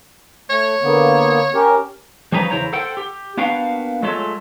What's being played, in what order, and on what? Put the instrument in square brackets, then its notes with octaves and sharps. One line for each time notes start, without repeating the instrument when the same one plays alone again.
[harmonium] A3 [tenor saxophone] C#5
[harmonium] D3 A#3 B3
C#4 G4 A#4
[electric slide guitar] F3 G3 C#4 D#4 B4 A#5
E2 C#3 E4 C5 C#5 A#5
A4 C5 F#5 G5
G4
A#3 B3 D4 F#4 F5 G5
F#3 G#3 A3 F4 A4 C#5